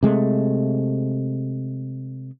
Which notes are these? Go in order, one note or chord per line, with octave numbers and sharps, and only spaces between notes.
C3 G#3 A3